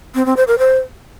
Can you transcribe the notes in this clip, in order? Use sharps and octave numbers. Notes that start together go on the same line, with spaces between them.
C4
C4
C5
A#4
C5